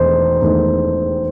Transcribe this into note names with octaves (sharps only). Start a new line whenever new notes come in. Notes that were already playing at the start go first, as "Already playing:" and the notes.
Already playing: E1 E2 D#3 A3 D#4 C5
E1 E2 D#3 A3 D#4